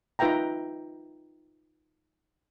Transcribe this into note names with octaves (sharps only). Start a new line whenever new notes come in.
D#4 F4 B4 E5 G5 A#5